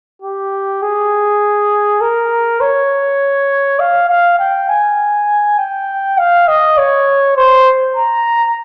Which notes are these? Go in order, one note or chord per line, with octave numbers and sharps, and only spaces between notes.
G4
G#4
A#4
C#5
F5
F5
G5
G#5
G5
F5
D#5
C#5
C5
A#5